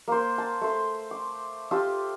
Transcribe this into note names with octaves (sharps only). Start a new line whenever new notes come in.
A#3 C5
A5
A3 C5
D6
F4 G4 A5 E6